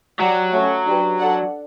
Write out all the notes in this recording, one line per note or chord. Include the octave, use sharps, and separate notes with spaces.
F#3 G4 D5 F#5
A3 C#4 F#4
D4 G4 B4
D4 A4 D5 F#5